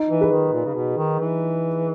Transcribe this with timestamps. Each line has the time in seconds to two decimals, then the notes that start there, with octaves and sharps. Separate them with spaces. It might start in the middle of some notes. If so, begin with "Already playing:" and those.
Already playing: D#4
0.10 E3
0.21 G#4 B4
0.32 D#3
0.53 A#2
0.65 C#3
0.75 B2
0.97 D#3
1.19 E3